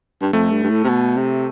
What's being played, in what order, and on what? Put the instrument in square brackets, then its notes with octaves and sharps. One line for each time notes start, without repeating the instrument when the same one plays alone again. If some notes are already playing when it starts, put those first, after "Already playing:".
[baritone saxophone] G2
[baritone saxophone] F2 [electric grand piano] A3
[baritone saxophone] G2
G2
A2
C3
B2
C3